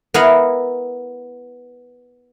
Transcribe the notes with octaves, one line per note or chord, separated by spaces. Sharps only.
B3 E4 A#4 F5 G#5